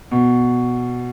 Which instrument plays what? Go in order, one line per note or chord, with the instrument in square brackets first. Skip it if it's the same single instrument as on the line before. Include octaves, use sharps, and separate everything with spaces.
[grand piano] B2